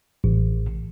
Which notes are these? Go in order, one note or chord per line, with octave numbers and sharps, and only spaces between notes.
A1